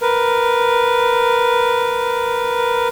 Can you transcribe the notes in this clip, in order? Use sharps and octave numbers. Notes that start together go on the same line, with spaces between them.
A#4 B4